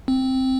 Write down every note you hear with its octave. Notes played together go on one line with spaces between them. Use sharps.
C4